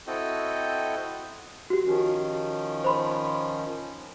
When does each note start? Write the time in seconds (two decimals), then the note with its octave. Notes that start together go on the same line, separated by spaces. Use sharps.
0.07 C4 E4 F#4 A4 D#5 G5
1.70 F#4 G4
1.85 D#3 F3 C#4
2.84 C5 B5 C6